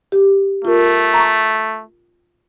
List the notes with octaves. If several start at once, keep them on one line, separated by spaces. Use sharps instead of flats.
G4
A3 F4 A#4
A#5 C#6